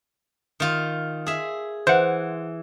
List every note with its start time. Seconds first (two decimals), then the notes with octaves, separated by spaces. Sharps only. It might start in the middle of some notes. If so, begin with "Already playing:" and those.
0.60 D#3 F4
1.27 G#4 E5
1.87 E3 C5 F#5